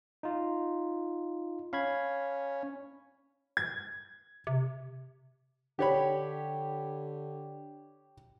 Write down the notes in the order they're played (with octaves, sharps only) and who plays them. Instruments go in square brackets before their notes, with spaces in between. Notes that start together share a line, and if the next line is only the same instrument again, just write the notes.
[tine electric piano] D#4 F4
[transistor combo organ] C#4 [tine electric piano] F5 B5 G#6
[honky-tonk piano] G#6
[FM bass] C3
[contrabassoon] D3 [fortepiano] G4 C#5 B5